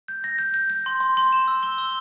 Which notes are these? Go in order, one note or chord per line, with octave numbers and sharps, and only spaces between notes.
G6
A#6
G6
G6
G6
C6
C6
C6
E7
E6
G7
E6